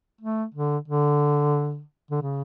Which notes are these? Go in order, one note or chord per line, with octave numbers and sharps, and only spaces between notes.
A3
D3
D3
D3
C#3